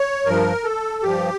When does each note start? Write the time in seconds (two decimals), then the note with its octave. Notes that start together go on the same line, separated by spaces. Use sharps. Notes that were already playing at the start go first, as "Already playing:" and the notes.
Already playing: C#5
0.26 G2 F3 A#4
0.64 A4
1.03 G2 F3 G4